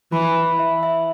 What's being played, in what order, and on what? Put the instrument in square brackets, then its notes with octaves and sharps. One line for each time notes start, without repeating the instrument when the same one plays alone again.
[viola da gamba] E3 [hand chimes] B5
[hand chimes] B5
E5
E5